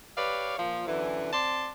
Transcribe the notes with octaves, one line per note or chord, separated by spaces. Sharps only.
G4 B4 C#5 D5 F5
A#2 F3
F#2 D3 E3
C4 D5 A5 C6